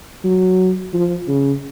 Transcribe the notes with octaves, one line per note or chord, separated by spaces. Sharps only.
F#3
F3
C#3